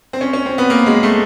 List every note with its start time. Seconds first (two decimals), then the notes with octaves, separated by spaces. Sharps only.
0.13 C4
0.21 C#4
0.33 C#4
0.46 C4
0.58 B3
0.70 A#3
0.86 G#3
1.03 A3